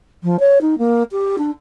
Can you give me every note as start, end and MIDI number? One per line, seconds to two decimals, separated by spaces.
0.23 0.39 53
0.40 0.59 73
0.61 0.78 63
0.78 1.03 58
1.12 1.36 67
1.38 1.51 62